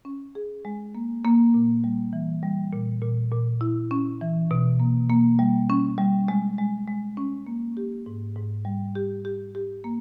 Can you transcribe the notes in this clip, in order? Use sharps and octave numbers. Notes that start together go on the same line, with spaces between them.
C#4
G#4
G#3
A#3
A#3
A#2
G3
E3
G3
A#2
A#2
A#2
E4
C#4
E3
B2
A#3
A#3
G3
C#4
G3
G#3
G#3
G#3
C#4
A#3
G4
G#2
G#2
G3
G4
G4
G4
A#3